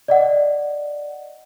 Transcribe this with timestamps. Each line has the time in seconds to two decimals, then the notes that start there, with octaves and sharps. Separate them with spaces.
0.08 D5 D#5 F#5